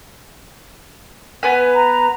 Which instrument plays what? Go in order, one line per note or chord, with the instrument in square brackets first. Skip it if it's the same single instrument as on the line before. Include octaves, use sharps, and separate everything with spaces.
[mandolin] B3 B4 G#5
[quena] A#5